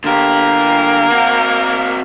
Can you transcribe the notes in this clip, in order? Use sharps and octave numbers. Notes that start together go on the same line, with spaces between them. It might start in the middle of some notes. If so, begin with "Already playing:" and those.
D3 A#3 G4
C4 F#4